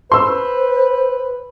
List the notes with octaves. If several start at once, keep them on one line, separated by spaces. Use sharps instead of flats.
B4 C5 C6 E6